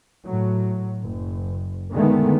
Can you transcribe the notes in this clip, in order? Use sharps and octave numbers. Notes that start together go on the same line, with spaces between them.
A2 F#3
F#1
D3 D#3 G#3 A3 B3